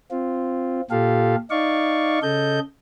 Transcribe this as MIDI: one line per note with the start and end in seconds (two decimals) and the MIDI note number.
0.11 0.81 60
0.11 0.81 65
0.91 1.36 46
0.91 1.36 65
0.91 1.36 67
0.91 1.36 69
0.91 1.36 77
1.50 2.19 63
1.50 2.19 74
1.50 2.19 77
1.50 2.19 85
2.23 2.59 49
2.23 2.59 69
2.23 2.59 75
2.23 2.59 91